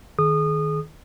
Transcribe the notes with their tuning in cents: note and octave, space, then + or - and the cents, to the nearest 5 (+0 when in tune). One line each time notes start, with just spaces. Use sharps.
D#3 -10 G#4 +30 D#6 -25